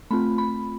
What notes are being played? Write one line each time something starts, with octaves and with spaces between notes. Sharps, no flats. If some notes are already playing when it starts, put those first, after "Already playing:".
A3 C4 F4 B5
B5